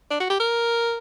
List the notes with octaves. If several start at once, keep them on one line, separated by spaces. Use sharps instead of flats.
D4
F#4
G4
A#4